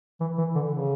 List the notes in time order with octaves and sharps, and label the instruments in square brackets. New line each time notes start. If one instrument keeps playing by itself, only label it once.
[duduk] E3
E3
D3
C#3